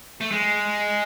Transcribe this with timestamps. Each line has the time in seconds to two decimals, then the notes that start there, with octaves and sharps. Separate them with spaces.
0.21 A3
0.31 G#3